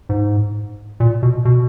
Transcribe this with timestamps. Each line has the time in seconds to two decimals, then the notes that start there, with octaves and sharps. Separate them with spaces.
0.09 G#2
1.00 A#2
1.23 B2
1.45 B2